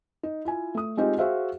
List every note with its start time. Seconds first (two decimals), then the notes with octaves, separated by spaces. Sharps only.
0.23 D#4
0.45 E4 F4 G#5
0.75 A3 D#6
0.97 G#3 C4 D#4 F4 G4 G#4
1.18 F#4 G#4 C5 E5 F5